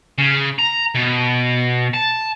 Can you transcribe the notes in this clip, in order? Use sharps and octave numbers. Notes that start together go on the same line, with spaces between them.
C#3
A#5
B2
A5